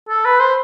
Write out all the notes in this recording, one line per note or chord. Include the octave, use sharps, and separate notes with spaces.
A4
B4
C5